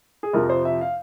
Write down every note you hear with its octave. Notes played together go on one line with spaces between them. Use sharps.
G#4
F2 C3 F3 A#4
C5
E5
F5